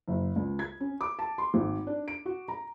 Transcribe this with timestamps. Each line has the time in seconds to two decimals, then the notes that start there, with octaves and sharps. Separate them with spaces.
0.08 F#1
0.36 C#2
0.59 G#6
0.80 C#4
1.01 D6
1.19 A5
1.38 C6
1.54 G#1
1.87 D4
2.08 D7
2.26 F#4
2.48 A#5